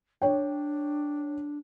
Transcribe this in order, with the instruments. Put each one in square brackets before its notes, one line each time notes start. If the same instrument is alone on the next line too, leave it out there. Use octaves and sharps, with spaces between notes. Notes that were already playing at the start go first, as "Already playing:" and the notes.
[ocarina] D4 [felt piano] C#5 G5